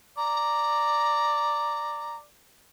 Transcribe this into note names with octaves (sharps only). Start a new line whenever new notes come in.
D5 A#5